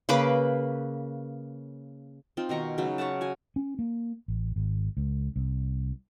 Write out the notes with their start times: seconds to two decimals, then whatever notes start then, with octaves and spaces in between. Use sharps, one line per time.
0.09 C#3 A#3 B4 D6
2.37 C4 D#4 F4
2.49 B2 D#3 A#5 C#6
2.78 C#3 F#3 D#4 B4
2.98 C#5 E5 F#5 A5
3.21 F#4 G#5
3.56 C#4
3.79 A#3
4.28 A1
4.56 G#1
4.97 C#2
5.36 C2